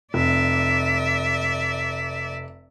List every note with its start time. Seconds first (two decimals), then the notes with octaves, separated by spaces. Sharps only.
0.14 F1 D5 E5